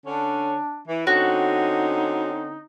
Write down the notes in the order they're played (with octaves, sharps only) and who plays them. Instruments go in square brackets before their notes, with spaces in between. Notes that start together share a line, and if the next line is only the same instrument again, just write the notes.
[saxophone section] D3 C#4 [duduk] D4
[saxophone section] E3
[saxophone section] D3 C4 C#4 [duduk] D#4 [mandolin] F#4